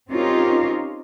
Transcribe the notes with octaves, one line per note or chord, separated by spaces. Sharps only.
C4 C#4 D#4 F4 G4 A#4